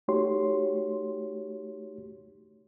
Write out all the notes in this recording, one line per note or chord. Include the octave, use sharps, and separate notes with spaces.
A3 D#4 F#4 G4 C#5 C6